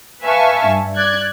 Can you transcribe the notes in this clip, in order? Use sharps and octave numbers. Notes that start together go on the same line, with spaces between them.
B4 E5 F5 G#5 A5 C#6
G2
D5 F#6 G#6